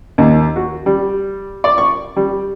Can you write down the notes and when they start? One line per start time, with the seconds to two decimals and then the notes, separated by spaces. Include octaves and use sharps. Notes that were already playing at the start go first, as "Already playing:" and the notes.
0.18 D#2
0.56 F#4
0.86 G3
1.64 D5
1.78 C#6
2.16 G3